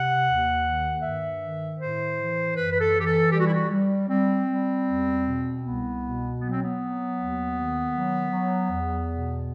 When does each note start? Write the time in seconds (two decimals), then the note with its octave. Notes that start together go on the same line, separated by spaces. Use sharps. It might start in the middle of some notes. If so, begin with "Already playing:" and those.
Already playing: C3 F#5
0.24 D#2
0.62 D#3
1.01 G2 E5
1.39 D#3
1.78 A2 C5
2.16 E3
2.55 F#2 B4
2.72 B4
2.80 A4
2.93 E3
2.99 G4
3.06 A4
3.32 G3 G4
3.39 F#4
3.46 E4
3.54 F#4
3.70 G3
4.09 G3 C4
4.47 G3
4.86 E2
5.24 B2
5.62 C2 B3
6.01 B2
6.39 F#3 B3
6.51 C4
6.61 B3
6.78 F#3
7.17 D#2
7.55 D#3
7.94 F#3
8.32 F#3
8.70 E2
9.09 B2